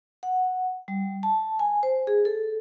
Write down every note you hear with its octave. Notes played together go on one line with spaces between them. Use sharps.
F#5
G3
A5
G#5
C5
G#4
A4